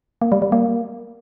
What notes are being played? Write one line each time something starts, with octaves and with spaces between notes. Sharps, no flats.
A#3
G3
G3
A#3